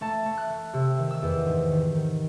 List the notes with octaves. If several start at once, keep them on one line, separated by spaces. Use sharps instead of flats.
A3 A5
A3
F#6
A3
C3 E6
D#3
E6
E2
G#2
D#3
D#3